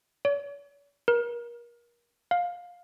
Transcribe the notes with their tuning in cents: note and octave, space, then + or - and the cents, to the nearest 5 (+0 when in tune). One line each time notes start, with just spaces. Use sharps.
C#5 +45
A#4 +35
F5 +15